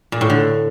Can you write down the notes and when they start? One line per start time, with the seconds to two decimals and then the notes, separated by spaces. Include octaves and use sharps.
0.12 A#2
0.21 A2
0.30 D3